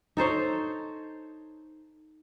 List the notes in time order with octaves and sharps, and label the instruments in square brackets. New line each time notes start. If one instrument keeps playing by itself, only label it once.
[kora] D#4 A4 C5 C#5